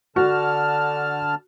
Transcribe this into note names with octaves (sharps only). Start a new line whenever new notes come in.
D3 F#4 A5 F6